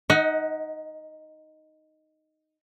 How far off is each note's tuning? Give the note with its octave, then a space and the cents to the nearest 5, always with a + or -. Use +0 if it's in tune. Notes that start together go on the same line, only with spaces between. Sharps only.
D#4 +0 D#5 +30 F#5 +0